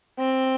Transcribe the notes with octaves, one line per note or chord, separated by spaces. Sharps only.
C4